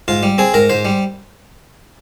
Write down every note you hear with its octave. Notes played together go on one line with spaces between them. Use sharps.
G#2 F4
G3
C4 G#4
G#2 A#4
G#2 C5
G3